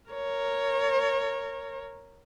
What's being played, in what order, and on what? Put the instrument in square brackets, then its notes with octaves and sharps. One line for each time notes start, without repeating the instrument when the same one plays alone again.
[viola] A#4 C#5